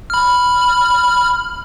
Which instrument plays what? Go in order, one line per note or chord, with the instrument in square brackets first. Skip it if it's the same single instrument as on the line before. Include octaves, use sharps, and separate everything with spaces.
[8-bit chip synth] B5 F6